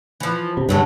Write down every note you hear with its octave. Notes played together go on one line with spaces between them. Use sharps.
E3 F3
C3
G2 D3 F#3 G#3